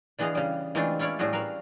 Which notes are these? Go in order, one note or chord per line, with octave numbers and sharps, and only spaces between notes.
D3 E3 B3 G#4 D#5 F5
C#3 G3
E3 G#3 A3 C4 D4 F4
C#4 E4 F4 C#5 D5
A2 G3 A3 F#4 G#4
A#4 B4 E5 F5